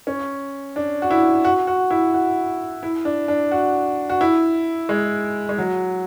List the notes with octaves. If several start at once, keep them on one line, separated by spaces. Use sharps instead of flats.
C#4
D4
F#4
E4
F#4
F#4
E4
F#4
E4
D4
D4
F#4
F#4
E4
G#3
G#3
F#3